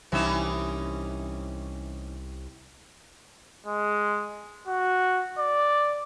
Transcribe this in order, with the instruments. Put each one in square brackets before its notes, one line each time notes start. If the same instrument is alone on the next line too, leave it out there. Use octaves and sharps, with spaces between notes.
[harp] C2 E6 E7 [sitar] E3 C#4 D#4
[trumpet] G#3
F#4
D5